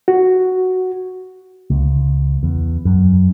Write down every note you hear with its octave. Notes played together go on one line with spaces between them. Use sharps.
F#4
C#2
E2
F#2